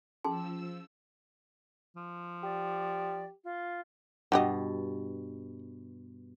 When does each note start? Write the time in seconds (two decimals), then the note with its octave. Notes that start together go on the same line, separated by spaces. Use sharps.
0.25 F3 C#4 G#4 A5 C6 E6
1.97 F3
2.43 G4 D5
3.44 F4
4.32 G2 B2 F#4 G4 D#5